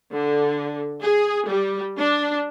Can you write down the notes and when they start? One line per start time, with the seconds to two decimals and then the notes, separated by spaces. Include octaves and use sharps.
0.12 D3
1.02 G#4
1.48 G3
1.97 D4